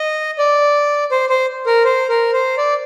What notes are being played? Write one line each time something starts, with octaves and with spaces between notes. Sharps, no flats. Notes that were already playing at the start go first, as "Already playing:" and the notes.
Already playing: D#5
D5
C5
C5
A#4
C5
A#4
C5
D5